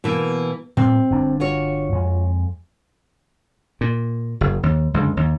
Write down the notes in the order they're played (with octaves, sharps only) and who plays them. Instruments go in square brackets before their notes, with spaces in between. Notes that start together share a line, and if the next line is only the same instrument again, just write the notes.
[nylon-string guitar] B2 E3 A#3
[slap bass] A2 G3 [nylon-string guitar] C4
[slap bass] G1 G2 D4
[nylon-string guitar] F4 F#4 C#5
[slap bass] F2 G#3
A#2
F#1
D#2
C#2 F#2 D3
D#2